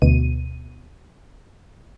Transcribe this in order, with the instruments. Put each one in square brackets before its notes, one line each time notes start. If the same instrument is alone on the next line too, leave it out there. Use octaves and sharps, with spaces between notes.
[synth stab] D2 B2 D#7